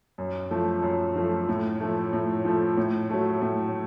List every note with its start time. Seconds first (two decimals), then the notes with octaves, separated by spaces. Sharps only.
0.18 F#2
0.51 F3 A3
0.83 F#2
1.16 F3 A3
1.48 A2
1.80 F3 A3
2.13 A2
2.45 F3 A3
2.77 A2
3.10 F#3 A3
3.42 A2